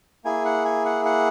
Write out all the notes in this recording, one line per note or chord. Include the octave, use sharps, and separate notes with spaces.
A#3 E4 G#4 G#5
F#5
G#5
F#5
F#5